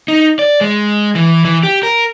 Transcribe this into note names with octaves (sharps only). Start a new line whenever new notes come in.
D#4
D5
G#3
E3
E3
G4
A#4